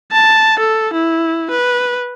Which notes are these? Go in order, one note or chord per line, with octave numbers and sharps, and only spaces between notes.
A5
A4
E4
B4